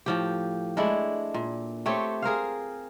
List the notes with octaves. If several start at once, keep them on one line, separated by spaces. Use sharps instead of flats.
A2 F3 G4
G#3 A3 D4 E4
A#2
A3 C4 G4 C#5
G#4 A#4 C5 F5